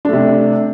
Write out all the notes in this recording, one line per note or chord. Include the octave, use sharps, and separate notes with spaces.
C3 A3 D4